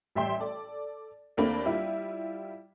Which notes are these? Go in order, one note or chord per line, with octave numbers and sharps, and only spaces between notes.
A1 G3 E5 G5 C6
A4 D5
D#2 A3 A#3 C4 D4 B5
G3 E4 F4